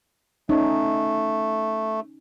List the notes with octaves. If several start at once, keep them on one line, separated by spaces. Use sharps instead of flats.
A3 C#4 D#4